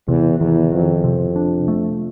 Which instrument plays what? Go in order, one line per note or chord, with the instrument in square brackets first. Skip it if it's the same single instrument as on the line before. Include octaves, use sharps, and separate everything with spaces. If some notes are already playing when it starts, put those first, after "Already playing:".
[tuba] E2 [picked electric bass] C3
[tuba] E2 [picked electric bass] D#3
[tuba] F2 [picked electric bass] D#3
[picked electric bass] C3
D4
A3